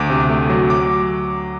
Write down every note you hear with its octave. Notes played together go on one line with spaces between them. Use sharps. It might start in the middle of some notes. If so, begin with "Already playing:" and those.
Already playing: D2 D6
C3
A3
F#3
D6